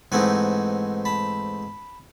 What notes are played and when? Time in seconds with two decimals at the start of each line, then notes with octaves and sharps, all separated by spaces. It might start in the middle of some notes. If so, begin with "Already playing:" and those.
0.12 G#2 E3 A3 C4 D#4 F#5 G#5
1.05 A5 B5